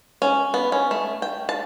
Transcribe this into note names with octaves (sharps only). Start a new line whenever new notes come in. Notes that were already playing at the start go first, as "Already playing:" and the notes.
C#4
B3
C#4
A3
G5
A5